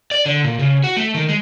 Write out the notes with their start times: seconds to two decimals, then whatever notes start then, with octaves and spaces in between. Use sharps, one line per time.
0.11 D5
0.26 D3
0.44 A#2
0.59 C#3
0.84 F#4
0.97 A3
1.15 D#3
1.29 G#3